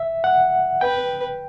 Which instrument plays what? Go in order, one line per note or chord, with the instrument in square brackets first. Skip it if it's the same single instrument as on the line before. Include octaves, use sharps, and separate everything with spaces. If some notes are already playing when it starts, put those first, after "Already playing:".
Already playing: [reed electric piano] E5
F#5
[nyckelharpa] B4 [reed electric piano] G5